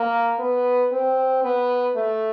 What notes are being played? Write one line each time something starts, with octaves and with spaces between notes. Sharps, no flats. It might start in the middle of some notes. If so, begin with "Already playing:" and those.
Already playing: A#3
B3
C4
B3
A3